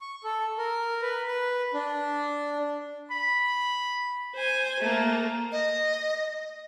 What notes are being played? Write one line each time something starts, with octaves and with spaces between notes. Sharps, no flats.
C#6
A4
A#4
B4
B4
D4
B5
C5 G#5
A3 A#3
D#5